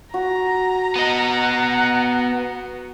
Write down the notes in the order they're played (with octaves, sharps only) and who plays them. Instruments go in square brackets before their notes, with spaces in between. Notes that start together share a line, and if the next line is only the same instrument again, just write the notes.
[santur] F#4 [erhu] A#5
[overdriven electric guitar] B3 D#5 [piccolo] F#5